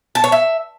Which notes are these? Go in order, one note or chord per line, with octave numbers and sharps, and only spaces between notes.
A5
C#5
E5